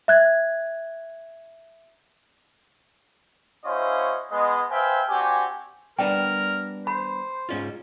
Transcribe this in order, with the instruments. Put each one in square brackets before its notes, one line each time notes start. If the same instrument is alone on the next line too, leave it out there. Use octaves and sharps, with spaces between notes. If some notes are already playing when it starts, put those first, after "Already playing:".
[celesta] E5 F#6 G#6
[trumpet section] C#4 E4 F#4 C5 D#5 F5
G#3 B3 D#5
B4 C5 E5 F5 G5 G#5
C4 D4 F#4 G4 G#5
[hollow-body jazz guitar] G3 B3 D4 [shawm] A#4 [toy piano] G5
[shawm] C5 [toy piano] B5
[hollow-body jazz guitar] G#2 C#4 F4